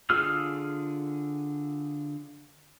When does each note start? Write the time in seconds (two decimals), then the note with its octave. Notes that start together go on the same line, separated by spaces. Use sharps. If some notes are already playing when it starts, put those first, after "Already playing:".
0.10 D3 F4 G#4 E6 F6